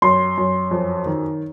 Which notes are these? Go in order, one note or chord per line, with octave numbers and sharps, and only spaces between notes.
F#2 C6
F#2
F2
D#3